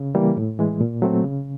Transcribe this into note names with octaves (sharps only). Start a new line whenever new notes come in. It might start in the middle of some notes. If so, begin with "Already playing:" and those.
Already playing: C#3
E3 G3 A#3
A2
E3 G#3
A#2
F#3 A3 C4
C#3